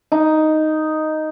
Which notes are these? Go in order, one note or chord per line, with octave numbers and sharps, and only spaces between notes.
D#4